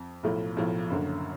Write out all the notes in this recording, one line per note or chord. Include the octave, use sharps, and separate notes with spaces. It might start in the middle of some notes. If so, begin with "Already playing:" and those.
Already playing: F2
B1 A2 F3 A3
B1 A2 F3 A3
F#1 F#2 D3